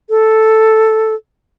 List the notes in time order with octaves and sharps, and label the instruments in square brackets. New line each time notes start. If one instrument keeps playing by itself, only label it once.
[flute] A4